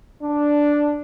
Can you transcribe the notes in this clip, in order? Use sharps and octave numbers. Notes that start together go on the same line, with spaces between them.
D4